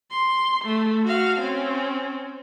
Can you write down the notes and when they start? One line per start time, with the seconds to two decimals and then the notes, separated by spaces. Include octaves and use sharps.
0.11 C6
0.65 A3
1.05 F#4 F5
1.40 C4 C#4